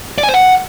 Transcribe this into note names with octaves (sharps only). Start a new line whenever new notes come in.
D5
G#5
C5
F#5